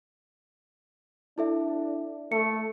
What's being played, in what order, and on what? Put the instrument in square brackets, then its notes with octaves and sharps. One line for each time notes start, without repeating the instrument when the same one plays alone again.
[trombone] D4 [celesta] E4 A4 E5
[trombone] A3 [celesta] C#7